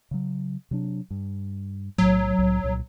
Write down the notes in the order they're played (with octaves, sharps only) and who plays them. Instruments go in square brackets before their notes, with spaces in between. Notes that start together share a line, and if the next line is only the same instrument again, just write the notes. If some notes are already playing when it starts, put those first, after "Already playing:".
[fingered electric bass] C#3 F#3
C3 F#3 D4
G2
[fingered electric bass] B1 A2 [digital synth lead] F#3
[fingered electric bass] C2 A2
C2 A#2